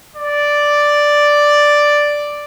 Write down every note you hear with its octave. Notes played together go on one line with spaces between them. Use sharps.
D5